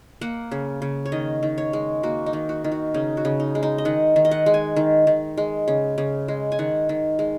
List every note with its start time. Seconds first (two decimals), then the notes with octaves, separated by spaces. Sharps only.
0.21 A#3 F#5
0.52 C#3
0.82 C#3
1.05 C#5
1.12 D#3 D#5
1.43 D#3
1.58 C#5
1.73 G#3
2.03 A#3 F#4
2.26 D#4
2.33 D#3
2.49 F#4
2.64 D#3
2.72 F#4
2.94 C#3 D#4
3.17 F#4
3.25 C#3
3.40 D#4
3.55 G#3
3.63 D#4
3.78 D#5
3.85 D#3 F#5
4.16 D#3
4.25 D#5
4.31 F#5
4.46 G#3
4.54 G#5
4.76 D#3
5.07 D#3
5.37 G#3
5.68 C#3
5.98 C#3
6.28 G#3
6.52 G#5
6.59 D#3 F#5
6.89 D#3
7.19 G#3